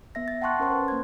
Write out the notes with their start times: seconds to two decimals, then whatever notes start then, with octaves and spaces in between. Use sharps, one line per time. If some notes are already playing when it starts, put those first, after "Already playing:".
0.15 B3 E5 A#6
0.28 A6
0.42 F#5 G5 A5 C6 C#6 F#6
0.60 C#4 A#4 C5 C6
0.72 B4
0.88 A#3 C5 G#6